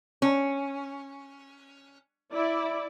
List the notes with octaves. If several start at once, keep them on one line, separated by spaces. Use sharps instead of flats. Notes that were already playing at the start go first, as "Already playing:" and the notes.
C#4
E4 D5